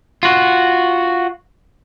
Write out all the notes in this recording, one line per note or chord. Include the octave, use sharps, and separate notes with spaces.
F4 F#4